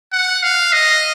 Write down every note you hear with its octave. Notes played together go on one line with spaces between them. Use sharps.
F#5
F5
D#5